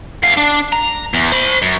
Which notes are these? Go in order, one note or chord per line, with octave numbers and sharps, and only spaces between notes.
E2 F5
D4
A#5
E2
C5 B5
F#2